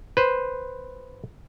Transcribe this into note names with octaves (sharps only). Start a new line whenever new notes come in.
B4 C5